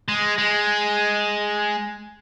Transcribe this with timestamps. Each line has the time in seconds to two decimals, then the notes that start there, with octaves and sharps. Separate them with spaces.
0.08 G#3
0.38 G#3